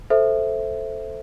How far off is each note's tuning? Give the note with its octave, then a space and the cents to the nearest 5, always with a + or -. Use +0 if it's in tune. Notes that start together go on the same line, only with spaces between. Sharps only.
A4 +0 C5 +0 E5 +0